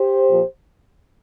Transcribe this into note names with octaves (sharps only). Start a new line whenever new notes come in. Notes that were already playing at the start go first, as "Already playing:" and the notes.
Already playing: G4 C5
A#2 F3